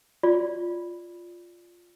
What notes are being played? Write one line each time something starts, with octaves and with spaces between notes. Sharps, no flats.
F4 D5